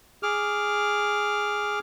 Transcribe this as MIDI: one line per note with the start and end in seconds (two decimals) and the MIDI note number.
0.23 1.79 68
0.23 1.79 86
0.23 1.79 89